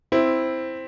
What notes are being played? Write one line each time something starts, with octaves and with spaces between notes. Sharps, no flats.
C4 E4